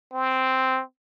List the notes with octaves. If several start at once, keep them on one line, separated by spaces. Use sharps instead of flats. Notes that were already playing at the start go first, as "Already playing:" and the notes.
C4